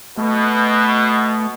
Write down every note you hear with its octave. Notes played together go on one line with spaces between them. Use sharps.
B2 A3